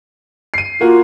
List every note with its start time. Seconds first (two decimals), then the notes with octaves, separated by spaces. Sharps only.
0.54 C7 D#7
0.81 A#3 F4 F#4